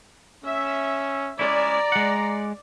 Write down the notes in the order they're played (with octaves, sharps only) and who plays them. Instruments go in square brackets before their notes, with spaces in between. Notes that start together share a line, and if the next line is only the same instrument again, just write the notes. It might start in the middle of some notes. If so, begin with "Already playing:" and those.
[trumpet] C#4 [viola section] E5
[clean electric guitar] G#3 C#4 E4 [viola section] D5 [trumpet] A#5
[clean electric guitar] G#3 F#5